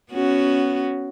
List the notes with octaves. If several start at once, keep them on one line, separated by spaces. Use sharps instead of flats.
B3 C#4 F#4